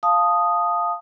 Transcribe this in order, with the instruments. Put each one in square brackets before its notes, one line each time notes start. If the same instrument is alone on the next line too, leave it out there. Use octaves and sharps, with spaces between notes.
[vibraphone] F5 A5 D#6